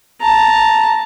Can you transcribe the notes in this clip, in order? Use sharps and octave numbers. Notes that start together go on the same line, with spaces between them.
A5 A#5